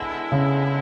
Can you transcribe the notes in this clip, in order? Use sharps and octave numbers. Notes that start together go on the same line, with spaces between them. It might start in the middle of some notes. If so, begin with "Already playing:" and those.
Already playing: D3 G#3 B3 E4
C#3